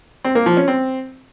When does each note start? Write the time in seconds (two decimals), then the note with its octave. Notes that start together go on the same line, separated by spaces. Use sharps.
0.25 C4
0.35 A#3
0.46 F3
0.57 C#4
0.68 C4